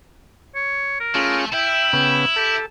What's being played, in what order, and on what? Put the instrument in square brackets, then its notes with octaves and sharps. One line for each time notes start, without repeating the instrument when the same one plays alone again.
[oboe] C#5
A#4
[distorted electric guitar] A3 [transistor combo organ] C#4 F4 G#4
[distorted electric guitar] E4 [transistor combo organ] E5 [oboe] G5
[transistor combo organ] C#3 B3
[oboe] G4 [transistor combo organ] A4